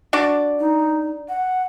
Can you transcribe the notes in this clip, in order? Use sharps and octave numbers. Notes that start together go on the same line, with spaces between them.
D4 F#4 D5
D#4
F#5